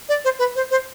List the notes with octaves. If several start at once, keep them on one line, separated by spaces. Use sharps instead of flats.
D5
C5
B4
C5
C5